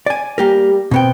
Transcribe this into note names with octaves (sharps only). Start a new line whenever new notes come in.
D5 G#5
G3 A#3 G4 A#4
B2 B3 C4 G5